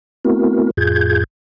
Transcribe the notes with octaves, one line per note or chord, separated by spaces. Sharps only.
A3 B3 C4 E4 F#4 A#4
F2 A2 F4 G#4 G6 G#6